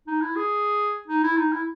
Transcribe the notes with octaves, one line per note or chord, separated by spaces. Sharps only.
D#4
E4
G#4
D#4
E4
D#4
E4